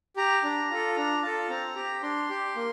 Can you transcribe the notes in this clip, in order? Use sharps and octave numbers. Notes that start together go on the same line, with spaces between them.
G4 A#5
D4 A#5
F4 A4
D4 A#5
F4 A4 A5
C4 A#5
G4
D4 C6
G4
A#3